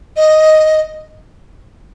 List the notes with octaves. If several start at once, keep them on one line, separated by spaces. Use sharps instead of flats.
D#5